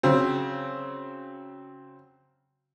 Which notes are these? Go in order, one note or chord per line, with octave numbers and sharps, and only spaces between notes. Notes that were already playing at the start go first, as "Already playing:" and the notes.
C#3 F#3 C4